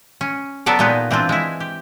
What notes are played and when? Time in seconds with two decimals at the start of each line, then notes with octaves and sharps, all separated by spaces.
0.21 C#4
0.66 F#3 B3 A4 A#4 D5
0.79 A#2 G#3 B3 D#4 G4
1.11 E3 C4 D4 F4
1.29 G#3 E4
1.60 G4